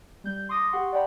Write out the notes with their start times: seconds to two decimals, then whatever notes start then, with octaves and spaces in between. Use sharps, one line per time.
0.24 G3 G6
0.49 C6 D6 D#6 A#6
0.72 G4 F#5 C6 C#6
0.92 D5 F#5 G5 A#5 B5